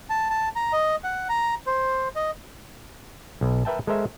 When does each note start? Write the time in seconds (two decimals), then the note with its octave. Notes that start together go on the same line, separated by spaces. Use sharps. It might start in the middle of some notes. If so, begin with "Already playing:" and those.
0.10 A5
0.30 A5
0.56 A#5
0.72 D#5
1.04 F#5
1.29 A#5
1.67 C5
2.15 D#5
3.41 B1
3.65 A#4 B4 E5 G5 A5
3.87 G#3 A4 A#4 C5 E5